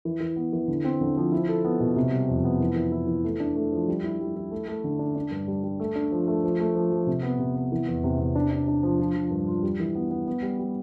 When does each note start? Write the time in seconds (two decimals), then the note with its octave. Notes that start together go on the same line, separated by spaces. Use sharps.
0.05 E3
0.20 E3
0.36 B3
0.53 E3
0.68 D3
0.84 C4
1.01 D3
1.17 F3
1.32 E4
1.48 A4
1.65 B3
1.80 B2
1.96 C3
2.12 G3
2.29 F2
2.45 B3
2.60 E3
2.76 E3
2.92 E4
3.07 E3
3.24 A3
3.40 D4
3.56 A3
3.72 F3
3.88 G3
4.04 E4
4.20 G3
4.36 E4
4.51 A3
4.68 A3
4.84 D3
4.99 D4
5.15 D4
5.31 G2
5.48 G3
5.63 G3
5.80 A3
5.95 D4
6.12 F3
6.28 A3
6.44 F3
6.60 A3
6.75 F3
6.92 F3
7.07 C3
7.23 B3
7.39 C3
7.55 B3
7.72 E3
7.88 E2
8.04 C3
8.19 C3
8.35 D4
8.51 D4
8.68 D4
8.83 F3
9.00 F3
9.15 F3
9.31 G2
9.47 F4
9.63 G3
9.80 E3
9.95 B3
10.11 B3
10.27 B3
10.42 G3
10.59 G3